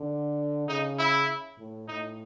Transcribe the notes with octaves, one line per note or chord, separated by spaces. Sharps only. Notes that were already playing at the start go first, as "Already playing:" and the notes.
Already playing: D3
C#3 D#4
E4
A2
A2 D#4